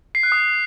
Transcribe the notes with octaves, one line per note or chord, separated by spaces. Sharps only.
C7
F#6
D#6